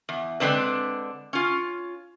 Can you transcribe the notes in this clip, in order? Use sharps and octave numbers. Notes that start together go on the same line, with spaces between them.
E2
D3 G#3 C4 D4 B4
C#4 F4